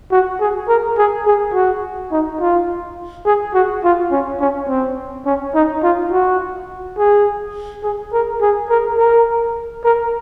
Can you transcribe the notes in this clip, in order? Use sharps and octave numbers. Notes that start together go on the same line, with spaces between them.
F#4
G#4
A#4
G#4
G#4
F#4
D#4
F4
G#4
F#4
F4
C#4
C#4
C4
C#4
D#4
F4
F#4
G#4
G#4
A#4
G#4
A#4
A#4
A#4